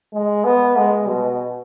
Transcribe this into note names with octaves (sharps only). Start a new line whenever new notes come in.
G#3
B3
G#3
B2